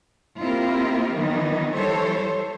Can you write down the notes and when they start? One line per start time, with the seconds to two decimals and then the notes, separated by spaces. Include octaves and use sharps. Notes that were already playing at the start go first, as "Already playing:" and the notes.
0.41 A#3 C4 E4 F4 G4 A#4
1.14 D#3 E3 F#3 B3 D#4
1.74 E3 G3 A4 C5 C#5